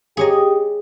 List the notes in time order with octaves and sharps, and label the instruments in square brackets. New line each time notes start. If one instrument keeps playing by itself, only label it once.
[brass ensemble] G4 [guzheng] G#4 C#5 D#5